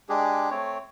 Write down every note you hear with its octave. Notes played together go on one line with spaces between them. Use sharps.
G#3 D4 G4 G#4
A3 C4 C#5